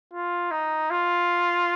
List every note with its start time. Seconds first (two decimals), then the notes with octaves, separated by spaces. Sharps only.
0.13 F4
0.51 D#4
0.90 F4